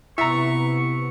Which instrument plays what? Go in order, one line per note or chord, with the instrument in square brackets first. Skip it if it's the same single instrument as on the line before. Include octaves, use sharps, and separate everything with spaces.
[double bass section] C3 B3 [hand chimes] E4 [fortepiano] E5 A#5 [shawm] C#6